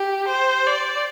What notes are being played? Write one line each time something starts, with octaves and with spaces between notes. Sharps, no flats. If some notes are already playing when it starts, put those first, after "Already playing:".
Already playing: G4
C5
D5